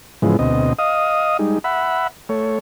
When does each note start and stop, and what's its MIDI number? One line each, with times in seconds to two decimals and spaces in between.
0.22 0.37 44
0.22 0.37 49
0.22 0.37 52
0.22 0.37 53
0.22 0.37 56
0.22 0.37 59
0.39 0.73 38
0.39 0.73 47
0.39 0.73 60
0.39 0.73 75
0.79 1.37 75
0.79 1.37 77
0.79 1.37 87
1.39 1.58 55
1.39 1.58 56
1.39 1.58 63
1.64 2.07 76
1.64 2.07 78
1.64 2.07 83
2.29 2.59 57
2.29 2.59 73